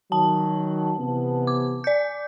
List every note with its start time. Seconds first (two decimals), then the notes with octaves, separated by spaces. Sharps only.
0.12 D#3 F#3 A5
0.98 C3 E3 B3
1.47 D6
1.84 D5 G6